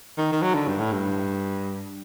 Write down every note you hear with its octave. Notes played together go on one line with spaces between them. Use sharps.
D#3
D#3
F#3
D3
G2
A2
G2